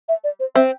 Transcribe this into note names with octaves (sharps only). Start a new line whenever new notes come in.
E5
D5
C5
C4 E5